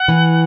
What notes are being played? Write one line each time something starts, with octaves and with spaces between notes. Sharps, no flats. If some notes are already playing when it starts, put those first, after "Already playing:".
Already playing: F#5
E3